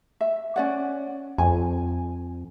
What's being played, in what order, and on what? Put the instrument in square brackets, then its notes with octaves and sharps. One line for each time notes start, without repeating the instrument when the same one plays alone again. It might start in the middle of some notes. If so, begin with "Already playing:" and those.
[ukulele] E5
C#4 D5 F#5
[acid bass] F2 [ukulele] G#5